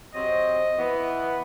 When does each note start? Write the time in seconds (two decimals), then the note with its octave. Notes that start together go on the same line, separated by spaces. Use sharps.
0.15 C3 F#3 C4 D#5
0.79 E3 B3